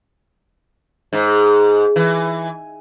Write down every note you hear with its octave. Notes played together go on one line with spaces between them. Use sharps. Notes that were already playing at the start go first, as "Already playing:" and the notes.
G#2
E3